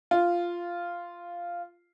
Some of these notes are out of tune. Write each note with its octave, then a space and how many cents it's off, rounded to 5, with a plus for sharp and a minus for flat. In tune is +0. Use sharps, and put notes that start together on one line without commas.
F4 -5